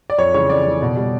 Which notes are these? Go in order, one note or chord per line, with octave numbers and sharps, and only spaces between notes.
D5
F2 C#5
C#3 E3 G#3 C#5
F2 D5
C#3 E3 G#3
B2
G3